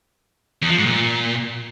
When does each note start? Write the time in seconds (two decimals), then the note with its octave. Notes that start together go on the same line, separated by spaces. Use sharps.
0.62 E2
0.70 F3
0.78 G#2
0.86 A#2